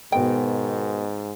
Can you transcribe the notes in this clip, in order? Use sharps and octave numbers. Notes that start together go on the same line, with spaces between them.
G#2 B2 D#3 B3 G5